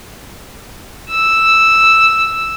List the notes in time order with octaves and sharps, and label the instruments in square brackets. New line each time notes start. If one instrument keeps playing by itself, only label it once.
[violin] E6